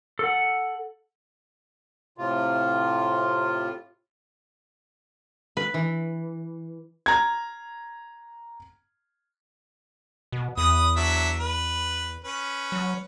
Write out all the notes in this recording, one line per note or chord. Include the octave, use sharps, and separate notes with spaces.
A4 F#5
A2 C3 F4
B4
E3
A#5 G#6
B2
E2 B4 D#6
F#3 D4 E5
B4
C#4 B4
F#3